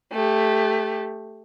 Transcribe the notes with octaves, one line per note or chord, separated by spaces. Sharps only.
A3 G4